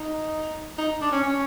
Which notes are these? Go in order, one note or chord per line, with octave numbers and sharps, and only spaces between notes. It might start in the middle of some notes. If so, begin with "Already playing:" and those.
Already playing: D#4
D#4
D4
C#4
C#4